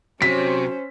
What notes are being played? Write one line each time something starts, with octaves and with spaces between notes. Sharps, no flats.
C3 F#3 C#4 C5 B6